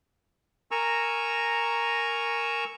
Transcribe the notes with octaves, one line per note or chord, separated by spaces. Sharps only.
A#4 G#5 A#5 C#6 E6